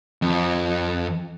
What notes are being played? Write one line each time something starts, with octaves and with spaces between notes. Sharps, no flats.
F2